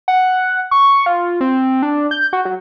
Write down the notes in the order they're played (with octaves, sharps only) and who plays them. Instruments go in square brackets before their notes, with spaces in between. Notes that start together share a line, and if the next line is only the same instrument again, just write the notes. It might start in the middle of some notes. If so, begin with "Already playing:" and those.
[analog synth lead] F#5
C#6
F4
C4
D4
G6
F#4
F#3